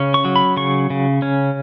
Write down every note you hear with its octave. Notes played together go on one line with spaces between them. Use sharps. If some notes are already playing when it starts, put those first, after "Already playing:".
Already playing: C#3 C#4
C#6
F#3
B5
C#3 C#6
C#3
C#4